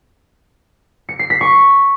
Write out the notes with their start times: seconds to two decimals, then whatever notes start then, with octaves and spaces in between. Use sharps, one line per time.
1.09 C#7
1.19 C7
1.30 B6
1.41 C#6